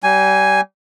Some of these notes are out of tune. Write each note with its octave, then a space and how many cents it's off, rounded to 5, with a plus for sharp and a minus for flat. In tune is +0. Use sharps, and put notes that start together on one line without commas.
G3 -30 G#5 +0